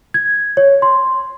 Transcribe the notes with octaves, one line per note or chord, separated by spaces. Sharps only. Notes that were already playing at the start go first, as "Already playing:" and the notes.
G#6
C#5
C6